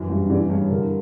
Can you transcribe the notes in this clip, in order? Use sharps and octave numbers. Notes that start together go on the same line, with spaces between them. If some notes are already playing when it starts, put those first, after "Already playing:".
Already playing: F#2 E3
G2
E3 D5
G2 C#5
D3 A#4